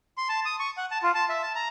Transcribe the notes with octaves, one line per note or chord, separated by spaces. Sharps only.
C6
A5
D#6
C#6
F#5
A5
F4
A5
E5
A5
A#5